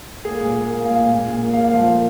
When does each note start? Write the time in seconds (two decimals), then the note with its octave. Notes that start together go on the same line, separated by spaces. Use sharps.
0.25 A#3 G#4
0.41 A#2
0.55 A#3
0.70 A#3
0.85 A#2 F5
1.00 A#2
1.14 A#2
1.29 A#2
1.43 A#3
1.53 F5
1.58 A#3
1.64 F5
1.73 F3
1.88 A#3